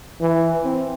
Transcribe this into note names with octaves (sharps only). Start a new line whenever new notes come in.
E3
C4